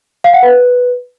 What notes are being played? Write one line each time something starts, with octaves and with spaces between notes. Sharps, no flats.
F5
F#5
B4